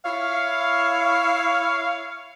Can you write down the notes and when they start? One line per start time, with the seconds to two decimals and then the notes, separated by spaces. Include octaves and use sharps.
0.04 E4 C#5 F5